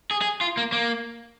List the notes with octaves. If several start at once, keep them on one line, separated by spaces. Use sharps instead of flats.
G#4
G#4
F4
A#3
A#3